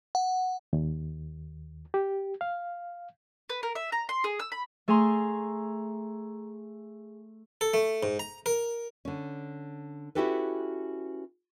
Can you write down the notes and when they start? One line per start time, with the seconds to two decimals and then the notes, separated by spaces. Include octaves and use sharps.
0.15 F#5
0.73 D#2
1.94 G4
2.41 F5
3.49 B4
3.63 A#4
3.75 E5
3.92 A#5
4.09 C6
4.24 G#4
4.39 E6
4.52 B5
4.88 A3 G#4 G#5 A#5 C6
7.61 A4
7.74 A3
8.03 G#2
8.19 A#5
8.46 A#4
9.05 D3 C#4
10.15 C#4 E4 F#4 G4 A4 B4